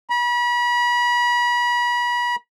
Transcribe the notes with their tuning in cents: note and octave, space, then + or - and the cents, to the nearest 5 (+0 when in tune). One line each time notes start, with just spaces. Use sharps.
B5 -35